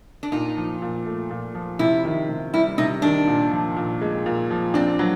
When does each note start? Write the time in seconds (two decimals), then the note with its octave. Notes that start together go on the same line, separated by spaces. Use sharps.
0.23 D4
0.32 A#2 D#4
0.57 F3
0.82 A#2
1.06 A3
1.31 A#2
1.55 F3
1.79 C3 E4
2.05 D#3
2.29 C3
2.54 G3 E4
2.78 C3 D#4
3.02 D#3 D4
3.27 A#2
3.51 F3
3.77 A#2
4.01 G#3
4.26 A#2
4.51 F3
4.74 C4 D4
4.99 F#3